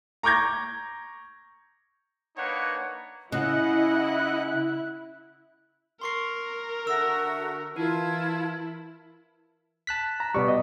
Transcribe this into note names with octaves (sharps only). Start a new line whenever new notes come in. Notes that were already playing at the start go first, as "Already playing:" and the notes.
A#5 C#6 D6 G6 G#6 A#6
A#3 D4 D#4 B4 C#5 F#5
C#3 E4 D#5 F#5 F#6
A#4 C6 C#6 C7
D3 F#4 A4 E5 E6 A#6
E3 E4 F4 A#4 A5 G#6
A5 F#6 B6
A#5
B2 G3 B3 D5 C#6
D#5